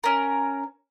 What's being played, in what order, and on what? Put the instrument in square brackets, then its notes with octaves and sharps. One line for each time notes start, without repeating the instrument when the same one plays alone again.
[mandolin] C#4 A#4